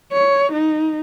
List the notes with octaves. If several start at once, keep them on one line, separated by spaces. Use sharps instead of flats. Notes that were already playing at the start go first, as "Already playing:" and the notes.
C#5
D#4